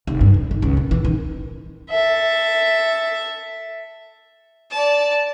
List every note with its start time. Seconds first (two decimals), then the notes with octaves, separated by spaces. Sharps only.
0.07 F1
0.21 G2
0.34 F3
0.51 D#3
0.62 C#2
0.77 A#2
0.91 E3
1.05 D#3
1.90 A4 E5
4.71 D5 A5